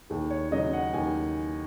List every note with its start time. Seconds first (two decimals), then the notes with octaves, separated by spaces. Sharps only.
0.10 D#2 G#4
0.30 C#5
0.51 C#3 F#3 D#5
0.73 F#5
0.94 D#2 G#5